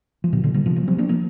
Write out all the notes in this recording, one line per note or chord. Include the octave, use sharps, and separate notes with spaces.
F3
A#2 D3
A#2 D3
D3 G3
C3 F3
F3 A#3
G3 C4
A#3 D4
F3 A#3